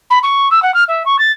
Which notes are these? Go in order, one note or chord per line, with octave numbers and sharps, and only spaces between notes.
B5
C#6
E6
F#5
F6
E5
C#6
A6